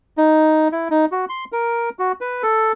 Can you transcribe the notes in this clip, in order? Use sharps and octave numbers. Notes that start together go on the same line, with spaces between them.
D#4
E4
D#4
F#4
C6
A#4
F#4
B4
A4